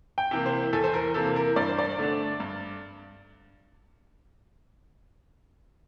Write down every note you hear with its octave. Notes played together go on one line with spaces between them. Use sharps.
G5
C3 E3 A#3
C5
E2 A4
C5
A#4
C3 E3 A#3 A4
A#4
G2 D5
C5
D5
D3 A3 D4
G2